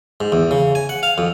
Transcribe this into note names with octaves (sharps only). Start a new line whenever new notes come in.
G#2
E2
C#3
G#5
F#5
F5
F2